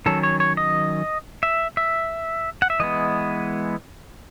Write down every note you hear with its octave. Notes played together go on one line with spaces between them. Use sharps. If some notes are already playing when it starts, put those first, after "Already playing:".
D#3 F#3 C#4 A4
C#5
C#5
D#5
E5
E5
F#5
E5
E3 G#3 B3 D#5